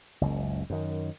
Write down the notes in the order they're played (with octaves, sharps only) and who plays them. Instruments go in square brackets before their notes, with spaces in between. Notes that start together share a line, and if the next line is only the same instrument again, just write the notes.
[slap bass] F#1 C#2
F#2 D#3